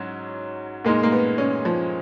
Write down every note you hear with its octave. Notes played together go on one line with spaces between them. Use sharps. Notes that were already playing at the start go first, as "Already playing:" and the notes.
Already playing: G#2 F#3 C#4
A#2 G#3 A#3 D#4
A#3
B3
C#4
F3